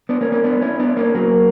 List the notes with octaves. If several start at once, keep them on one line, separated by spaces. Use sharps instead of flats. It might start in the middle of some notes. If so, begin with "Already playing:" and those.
B3 D4
A#3 C#4
A#3 C#4
B3 D4
C#4 E4
B3 D4
A#3 C#4
F#3 A#3